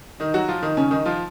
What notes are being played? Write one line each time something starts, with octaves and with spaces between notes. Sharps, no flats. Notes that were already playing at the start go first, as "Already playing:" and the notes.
D#3 D#4
F#3 F#4
F3 F4
D#3 D#4
C#3 C#4
D#3 D#4
F3 F4